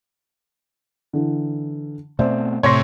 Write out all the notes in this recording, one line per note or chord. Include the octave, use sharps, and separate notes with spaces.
D3 E3
B2 A3 C4 C5 D5 E5
A2 C3 C#5 C6 A#6